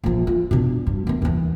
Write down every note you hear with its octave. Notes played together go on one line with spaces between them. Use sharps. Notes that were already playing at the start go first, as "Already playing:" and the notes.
A#1 F3
F4
B2 D4
G2
F#2 B3
D#2 E3